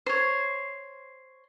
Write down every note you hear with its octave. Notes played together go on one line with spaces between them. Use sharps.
C5 C#5